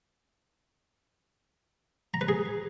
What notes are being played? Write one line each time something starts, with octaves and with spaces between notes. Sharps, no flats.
A#5
B4
G#4